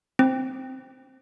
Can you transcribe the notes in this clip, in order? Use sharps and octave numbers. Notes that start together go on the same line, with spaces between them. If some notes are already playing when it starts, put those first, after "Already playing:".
C4